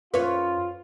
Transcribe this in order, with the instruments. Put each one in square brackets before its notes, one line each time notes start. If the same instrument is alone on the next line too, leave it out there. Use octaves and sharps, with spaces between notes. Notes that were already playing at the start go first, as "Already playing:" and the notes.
[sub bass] F#2 [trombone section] F4 [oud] B4 C#5